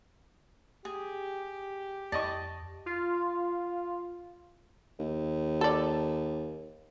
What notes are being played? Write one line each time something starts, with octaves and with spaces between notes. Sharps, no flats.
G4 G#4
F2 D5 D#5 A5 C#6
F4
D#2
A4 D5